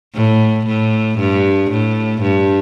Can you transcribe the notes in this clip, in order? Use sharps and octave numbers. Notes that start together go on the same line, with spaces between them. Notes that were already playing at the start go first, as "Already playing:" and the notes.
A2
A2
G2
A2
G2